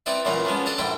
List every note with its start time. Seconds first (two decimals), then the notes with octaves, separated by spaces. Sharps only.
0.06 C4 D#4 E4 B4 D5 E5
0.25 C#2 A#2 E3 F#3 A#3 A#5
0.45 F3 F#3 G#3 B3 C#4
0.66 D4 A4 D#5 A5 A#5
0.78 A#1 G#2 D3 E4 E5 G5